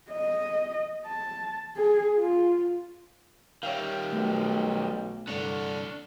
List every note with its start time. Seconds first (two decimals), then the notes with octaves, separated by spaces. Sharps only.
0.10 D#5
1.06 A5
1.76 G#4
2.18 F4
3.63 D#3 G3 C#5 E5 F5
4.13 B1 A3
5.27 C2 G2 D3 D4 C#5